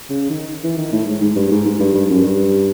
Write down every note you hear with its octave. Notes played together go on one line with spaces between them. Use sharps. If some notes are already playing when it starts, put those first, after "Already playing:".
C#3
D#3
E3
D#3
A2
G#2
G#2
G2
G#2
G#2
G2
G2
F#2
G2